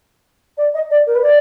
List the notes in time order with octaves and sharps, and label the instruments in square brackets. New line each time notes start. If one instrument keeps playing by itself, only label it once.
[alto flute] D5
D#5
D5
A#4
B4
D5